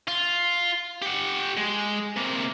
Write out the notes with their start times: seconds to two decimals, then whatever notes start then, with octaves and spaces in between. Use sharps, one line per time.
0.08 F4
1.02 G4 F#5
1.57 G#3
2.16 C3 A#3